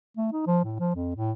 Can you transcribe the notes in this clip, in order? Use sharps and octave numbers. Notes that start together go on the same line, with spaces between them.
A3
D#4
F3
A2
F3
F2
A2